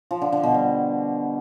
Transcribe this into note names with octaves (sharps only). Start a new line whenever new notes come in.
F3
D3
D3
B2
G3